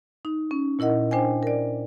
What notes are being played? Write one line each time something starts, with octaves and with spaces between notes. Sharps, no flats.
D#4
C#4
A#2 E4 A#4 D#5 F#5
D4 C5 G5 G#5
A#4 D5